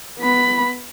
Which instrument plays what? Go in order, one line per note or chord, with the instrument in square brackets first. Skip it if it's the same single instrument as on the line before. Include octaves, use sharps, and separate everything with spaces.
[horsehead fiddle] B3 B5